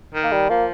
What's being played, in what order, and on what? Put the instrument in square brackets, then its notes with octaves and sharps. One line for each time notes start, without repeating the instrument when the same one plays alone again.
[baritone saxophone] D#3
[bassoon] A#3
G3
[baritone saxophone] F3 [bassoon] A#3